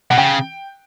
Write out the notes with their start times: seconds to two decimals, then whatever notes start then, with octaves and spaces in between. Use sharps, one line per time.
0.10 B2 F#5
0.18 C#3 G5